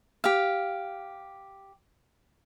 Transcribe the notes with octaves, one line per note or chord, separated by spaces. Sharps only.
G4 F5